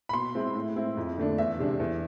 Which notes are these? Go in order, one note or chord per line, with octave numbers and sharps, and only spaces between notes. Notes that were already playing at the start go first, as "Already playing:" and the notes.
B5
B2 C6
G#3 C4 E4
A2
G#3 C4 E4
F2
D3 A3 D4
E2 E5
C3 G#3 D4
E2